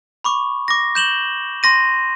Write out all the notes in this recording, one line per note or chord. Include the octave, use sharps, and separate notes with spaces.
B5 C#6 D6
D6 A#6
G6 E7 F#7 G7
C6 A#6 D#7